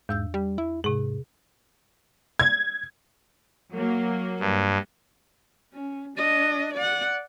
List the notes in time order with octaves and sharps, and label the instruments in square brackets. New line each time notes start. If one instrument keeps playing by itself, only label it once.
[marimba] E2 E6 G6 [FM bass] G#2
[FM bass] G3
E4
[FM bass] G#2 [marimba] C3 G#4
[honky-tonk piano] G#6
[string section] F#3 A#3
[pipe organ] G2
[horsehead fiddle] C#4
D4 D#5
D5 F#5